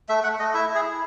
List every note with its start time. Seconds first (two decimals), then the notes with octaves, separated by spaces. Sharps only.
0.09 A3 E5
0.24 A3 F#5
0.39 A3 D#5
0.54 E4 E5
0.70 E4
0.75 G#4
0.85 E4